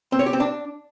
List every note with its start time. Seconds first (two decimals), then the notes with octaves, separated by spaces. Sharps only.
0.12 C4
0.19 C#5
0.26 G4
0.33 C4
0.40 D4